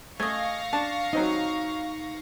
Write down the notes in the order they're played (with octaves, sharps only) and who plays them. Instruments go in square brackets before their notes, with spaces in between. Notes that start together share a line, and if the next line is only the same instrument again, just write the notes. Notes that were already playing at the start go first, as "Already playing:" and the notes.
[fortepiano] A3 [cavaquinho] D#5 G#5 [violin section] F5 C#6 A#6
[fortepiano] D4 [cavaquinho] A5
[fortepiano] F#3 C4 D#5 [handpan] D#4